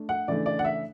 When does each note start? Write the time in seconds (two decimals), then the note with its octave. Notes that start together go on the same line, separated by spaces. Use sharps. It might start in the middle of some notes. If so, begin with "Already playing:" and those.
Already playing: A3 D4
0.09 F#5
0.28 C#3 E3 A3 D4 D5
0.46 D5
0.59 F#5
0.64 E5